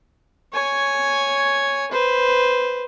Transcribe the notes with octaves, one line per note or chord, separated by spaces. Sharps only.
C#5 G#5
B4 C5